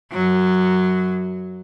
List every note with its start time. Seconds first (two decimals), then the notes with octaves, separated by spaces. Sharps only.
0.12 F#2 F#3